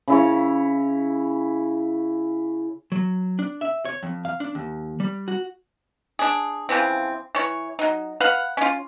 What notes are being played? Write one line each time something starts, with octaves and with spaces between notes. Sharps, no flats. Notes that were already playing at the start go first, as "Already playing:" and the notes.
C#3 E4 C#5
F#3
D4
E5
C#5
F2
F5
D4
D#2
G3
F#4
D4 G#4
C#3 E3 F3 C4
E3 C#5
F#3 D#4
B4 F5 F#5
C#4 F4